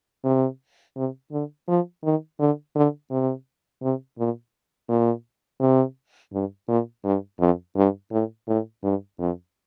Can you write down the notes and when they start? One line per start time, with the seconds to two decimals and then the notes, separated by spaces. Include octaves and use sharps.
0.24 C3
0.96 C3
1.32 D3
1.68 F3
2.03 D#3
2.39 D3
2.75 D3
3.10 C3
3.82 C3
4.18 A#2
4.89 A#2
5.60 C3
6.33 G2
6.68 A#2
7.04 G2
7.39 F2
7.76 G2
8.11 A2
8.48 A2
8.83 G2
9.19 F2